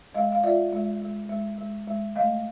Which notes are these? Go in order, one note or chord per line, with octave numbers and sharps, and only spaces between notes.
G#3 D#5 F5
F5
F4 D5 E5
G#3
G#3
G#3
G#3
G#3
A3 D#5 F5